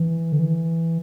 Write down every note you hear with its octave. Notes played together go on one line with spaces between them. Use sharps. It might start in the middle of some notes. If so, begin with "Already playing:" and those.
Already playing: E3
D3
E3